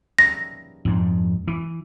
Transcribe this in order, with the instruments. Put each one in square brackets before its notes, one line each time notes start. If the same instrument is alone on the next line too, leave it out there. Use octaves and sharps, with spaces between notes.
[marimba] A#6
[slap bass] F2 G#2
E3